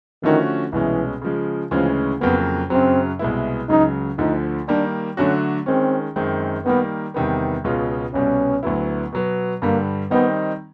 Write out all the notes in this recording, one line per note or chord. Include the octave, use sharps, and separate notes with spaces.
D3 D#3 F3 A3 C#4 F#4
C2 B2 E3 G#3 C#4
C#3 F3 G#3
D2 C#3 E3 F3 G#3 C#4
F2 C#3 F#3 A#3 B3
F#2 C#3 F#3 C4
C2 B2 G#3 B3 E4
C#2 C#3 F#3 D#4
D2 D3 F3 D#4
D#3 G3 A#3 D4
D3 F#3 A3 C#4 D4 F#4
D#3 G#3 C4 C#4
F#2 D#3 G#3 C4
D#3 G3 A#3 B3
E2 C3 D#3 G3 B3
C#2 B2 G#3 C#4 F4
C2 B2 G3 B3 C#4
D2 D3 F#3 B3 E4
B2 F#3 B3
G2 D3 G3 A#3
D#3 G3 B3 C4 D#4